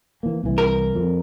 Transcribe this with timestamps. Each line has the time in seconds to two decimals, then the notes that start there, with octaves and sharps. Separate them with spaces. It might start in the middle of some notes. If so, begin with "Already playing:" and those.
0.23 E3 A#3
0.44 C2 E3
0.58 A#4
0.95 F2